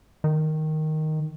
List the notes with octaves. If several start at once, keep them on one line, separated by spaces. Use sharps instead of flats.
D#3